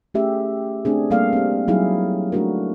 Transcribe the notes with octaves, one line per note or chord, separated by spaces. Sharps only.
A3 C#4 G4 G#4 E5
A3 C4 D4 G#4
G3 A#3 A4 D5 F5
C4 G4
F#3 G3 D#4 E4 G#4 F5
A3 D4 F#4 A#4